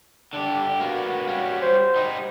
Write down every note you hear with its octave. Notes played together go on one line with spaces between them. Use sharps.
D3 D4 G4
A#3 B3 F#4
G3 C#4
C5
G3 D#4